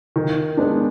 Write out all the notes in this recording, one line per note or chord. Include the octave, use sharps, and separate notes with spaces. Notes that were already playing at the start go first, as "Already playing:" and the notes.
D#3
G#3 B3 D4